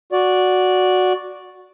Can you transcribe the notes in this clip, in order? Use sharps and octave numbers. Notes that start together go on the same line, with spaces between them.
F#4 D5